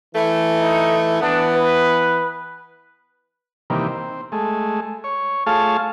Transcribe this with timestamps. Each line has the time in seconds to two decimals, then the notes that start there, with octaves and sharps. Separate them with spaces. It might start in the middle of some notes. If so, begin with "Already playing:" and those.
0.15 E3 A3
0.59 D#4
1.21 E3 B3 D4
1.55 B4
3.70 C3 D#3 E3 G3 A#3
3.87 C4
4.32 G#3 A3
5.04 C#5
5.46 A3 F4 G#4 C#5 F5 A5